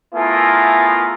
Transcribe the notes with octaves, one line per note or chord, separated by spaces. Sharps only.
A3 B3 E4 F4 G#4 A#4